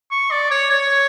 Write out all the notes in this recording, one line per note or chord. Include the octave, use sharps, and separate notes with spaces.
C#6
D5
C#5
C#5